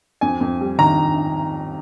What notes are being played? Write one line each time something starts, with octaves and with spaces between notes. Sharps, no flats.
F2 G#5
F2
G3
D#3 A#5